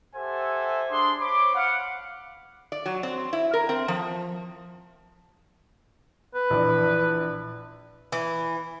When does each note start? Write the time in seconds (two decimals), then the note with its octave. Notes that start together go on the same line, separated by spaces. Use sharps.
0.15 G4 A4 C5 E5 F#5 G#5
0.90 D4 G#4 C6
1.19 C5 C#5 B5 D6
1.55 F5 F#5
2.72 D5
2.86 F#3
3.03 C4
3.33 E4
3.54 A#4
3.69 C4
3.88 F3
6.35 B4
6.50 A#1 E3 D5
8.12 E3